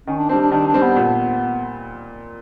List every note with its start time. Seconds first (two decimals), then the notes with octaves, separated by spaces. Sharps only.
0.07 D#3 C#4
0.18 D4
0.29 G3 C4 D4
0.41 D4
0.52 D#3 D4
0.67 D4
0.74 G3 C4
0.82 B3
0.96 A#2